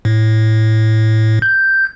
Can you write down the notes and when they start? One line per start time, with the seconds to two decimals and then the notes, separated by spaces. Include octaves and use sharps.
0.05 A2
1.42 G6